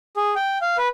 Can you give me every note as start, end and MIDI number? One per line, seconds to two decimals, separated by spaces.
0.17 0.34 68
0.36 0.58 79
0.62 0.77 77
0.78 0.88 71